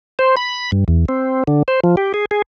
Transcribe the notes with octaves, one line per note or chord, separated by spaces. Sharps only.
C5
B5
G2
E2
C4
D3
C5
F3
G4
G#4
G#4